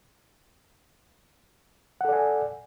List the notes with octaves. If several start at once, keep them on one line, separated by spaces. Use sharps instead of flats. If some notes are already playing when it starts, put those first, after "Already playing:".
A4 D5 F#5 G#5